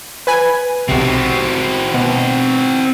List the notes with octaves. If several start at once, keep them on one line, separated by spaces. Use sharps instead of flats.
B4 G#5
B1 C3 C4 F#4
B2